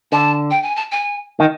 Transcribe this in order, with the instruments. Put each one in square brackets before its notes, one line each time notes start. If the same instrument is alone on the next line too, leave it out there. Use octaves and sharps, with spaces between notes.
[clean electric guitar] D3 [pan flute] A5
[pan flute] G5
G#5
A5
G#5
[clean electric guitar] D#3